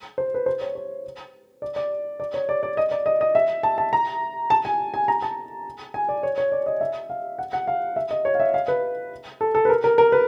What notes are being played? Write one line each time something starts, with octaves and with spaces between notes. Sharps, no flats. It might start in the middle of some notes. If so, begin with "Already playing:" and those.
C5
B4
C5
C#5
C#5
D5
D5
D5
C#5
D5
D5
D#5
D5
D#5
D#5
E5
A5
A5
A#5
A5
G#5
G#5
A#5
A5
G#5
D5
C#5
C#5
D5
D#5
E5
F5
F#5
F#5
F5
E5
D#5
C#5
F5
E5
F5
B4
A4
A4
B4
A#4
A#4
A#4
B4